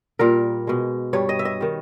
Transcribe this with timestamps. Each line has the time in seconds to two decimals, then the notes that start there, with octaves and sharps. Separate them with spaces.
0.19 A#2 G3 A#4
0.67 B2 G#3
1.13 G2 G3 C#5
1.29 D#5
1.39 E5
1.45 D#5
1.61 D#3 G3